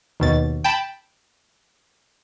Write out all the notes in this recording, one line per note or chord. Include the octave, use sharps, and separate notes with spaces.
D#2 B2 A6
G5 A5 B5